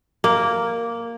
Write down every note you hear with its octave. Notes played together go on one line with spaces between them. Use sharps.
A#3